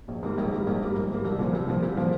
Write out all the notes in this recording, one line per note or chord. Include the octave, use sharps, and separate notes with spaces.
A#1
G#2 G3 A#3
A#1
G#2 G3 A#3
A#1
G#2 G3 A#3
A#1
G#2 G3 A#3
C2
A#2 F3
C2
A#2 F3
C2
A#2 F3